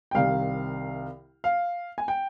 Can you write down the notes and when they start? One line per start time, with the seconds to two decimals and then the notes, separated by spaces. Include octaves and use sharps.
0.11 G5
0.15 C2 C3 D#3 G3 F5
1.44 F5
1.98 G#5
2.08 G5